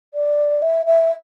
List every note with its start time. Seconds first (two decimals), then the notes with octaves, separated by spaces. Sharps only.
0.14 D5
0.62 E5
0.86 E5